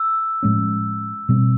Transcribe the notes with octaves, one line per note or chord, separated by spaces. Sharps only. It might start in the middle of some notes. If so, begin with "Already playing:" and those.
Already playing: E6
A2 F3 G#3 C#4
B2 G3 C4